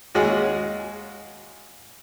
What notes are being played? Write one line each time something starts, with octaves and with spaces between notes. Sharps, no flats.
D#2 G#3 C#4 F#4 G#4 F#5